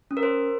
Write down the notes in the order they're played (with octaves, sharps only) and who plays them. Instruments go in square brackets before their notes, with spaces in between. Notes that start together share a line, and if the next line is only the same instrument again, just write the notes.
[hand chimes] C#4
A#4
C5